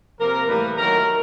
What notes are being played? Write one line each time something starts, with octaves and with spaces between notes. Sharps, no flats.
C3 F3 A#3 A#4
A2 E3 G3 A#3 B4
D#3 F#3 A3 A#4